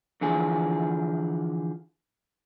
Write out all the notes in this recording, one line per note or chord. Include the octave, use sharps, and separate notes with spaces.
D3 E3 F3 G#4